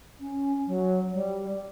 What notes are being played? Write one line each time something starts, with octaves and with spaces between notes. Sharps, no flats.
C#4
F#3
G3